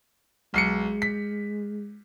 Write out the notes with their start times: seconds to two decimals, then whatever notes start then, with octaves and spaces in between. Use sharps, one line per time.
0.54 B1 G#3 C7 C#7
1.02 B6